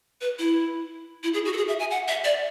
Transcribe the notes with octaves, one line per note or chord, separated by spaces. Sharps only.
B4
E4
E4
G#4
F#4
A4
G#4
E5
G#5
F#5
E5
D5